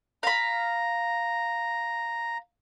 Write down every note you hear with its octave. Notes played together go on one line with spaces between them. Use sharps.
F5 A#5 B5